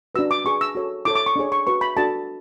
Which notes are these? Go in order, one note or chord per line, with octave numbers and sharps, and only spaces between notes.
D4 F#4 B4 E6
D6
D4 G#4 B4 C#6
E6
F#4 A4 C#5
E4 A4 C#5 D6
D6
C#6
D4 G#4 C#5
C#6
F#4 B4 C#6
B5
D4 F#4 A4 A5